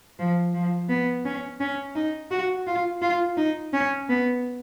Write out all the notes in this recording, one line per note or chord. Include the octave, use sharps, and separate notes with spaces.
F3
F3
B3
C#4
C#4
D#4
F#4
F4
F4
D#4
C#4
B3